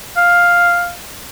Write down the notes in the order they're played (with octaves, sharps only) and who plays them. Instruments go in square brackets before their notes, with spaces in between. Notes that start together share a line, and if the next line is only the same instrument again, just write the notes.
[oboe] F5